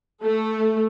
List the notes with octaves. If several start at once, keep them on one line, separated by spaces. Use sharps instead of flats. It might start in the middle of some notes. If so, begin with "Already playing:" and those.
A3 A4